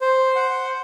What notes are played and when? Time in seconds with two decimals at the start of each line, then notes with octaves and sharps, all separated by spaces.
0.01 C5
0.36 F#5